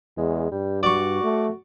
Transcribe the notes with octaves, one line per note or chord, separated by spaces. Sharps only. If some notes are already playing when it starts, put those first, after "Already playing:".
E2 G#3
G2 G3
F#4 D5 C#6
A3